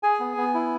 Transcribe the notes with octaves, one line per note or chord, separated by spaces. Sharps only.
G#4 G#5
B3
B3
E4